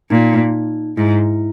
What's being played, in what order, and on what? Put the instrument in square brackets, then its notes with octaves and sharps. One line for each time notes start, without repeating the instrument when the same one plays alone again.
[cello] A#2 [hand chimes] D#4
[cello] G#2 [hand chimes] E4